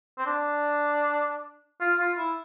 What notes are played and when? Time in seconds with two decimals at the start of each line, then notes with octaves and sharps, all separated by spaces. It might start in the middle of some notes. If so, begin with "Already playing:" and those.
0.18 C4
0.26 D4
1.80 F4
1.99 F4
2.18 E4